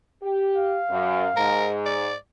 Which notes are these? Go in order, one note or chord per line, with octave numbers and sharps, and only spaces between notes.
G4
F5
F#2
G#2 A#4
D5